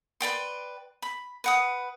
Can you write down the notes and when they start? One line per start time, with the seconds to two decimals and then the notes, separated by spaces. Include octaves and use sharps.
0.20 B4 D5 G5 C6
1.02 B5
1.44 B4 F#5 D#6